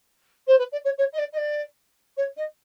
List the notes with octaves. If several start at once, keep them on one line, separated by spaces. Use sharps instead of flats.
C5
B4
D5
C#5
C#5
D#5
D5
D#5
D5
C#5
D#5